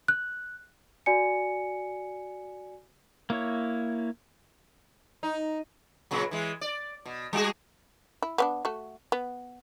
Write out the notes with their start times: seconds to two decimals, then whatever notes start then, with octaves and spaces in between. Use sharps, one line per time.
0.08 F#6
1.06 F#4 D5 G#5 C#7
3.30 A#3 E4 C#5
5.23 D#4
6.11 A#2 C#3 F#3
6.31 E3 G#3
6.61 D5
7.05 B2
7.33 G3 F#4 G#4
8.22 E4
8.38 B3 C#4 D4
8.65 A3 F#4
9.12 B3